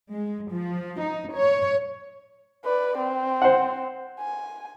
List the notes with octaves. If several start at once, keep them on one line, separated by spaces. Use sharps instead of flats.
G#3
F3
D#4
C#5
B4 D5
C4
C5 F#5
G#5